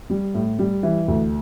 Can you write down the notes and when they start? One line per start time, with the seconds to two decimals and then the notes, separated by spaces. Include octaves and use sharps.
0.10 G3
0.34 A2
0.59 G3
0.83 E3
1.08 D2